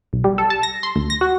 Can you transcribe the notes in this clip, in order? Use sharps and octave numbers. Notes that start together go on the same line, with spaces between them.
B1
G3
A4
A5
A#6
C6
D2
A#6
F#4